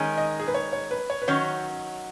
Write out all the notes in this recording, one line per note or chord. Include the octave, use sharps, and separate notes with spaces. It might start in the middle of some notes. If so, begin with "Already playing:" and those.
Already playing: D#3 G#3 C#4
D#5
G#4
B4
C#5
C#5
B4
C#5
B4
D#3 F#3 C#4 C#5